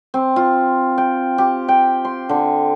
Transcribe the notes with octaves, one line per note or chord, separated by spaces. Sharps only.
C4
F4
G5
G4
G5
C6
D3